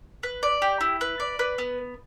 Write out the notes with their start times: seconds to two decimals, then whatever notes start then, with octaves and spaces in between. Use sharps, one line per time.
0.23 B4
0.43 D5
0.62 G4
0.81 E4
1.01 B4
1.20 D5
1.39 B4
1.58 B3